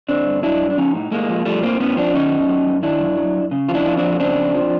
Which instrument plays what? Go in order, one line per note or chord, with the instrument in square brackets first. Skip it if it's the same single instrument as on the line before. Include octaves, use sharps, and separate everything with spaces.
[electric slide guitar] D3 C4 D4
G2
F#3 D4 E4
G2
D4
F3 C#4 D#4
A2
A2 G#3 A#3
F3
F3 G3 A3
A2 A#3 C4
A2 B3 C#4
F3 C4 D4
D#3 C#4 D#4
F#2
F#3
F#2
D#3 D4 E4
F#2
F#3
F#2
C#3
F2 F4
D4 E4
F3
C4 D4
F2
C#3 C4 D4
F2
F3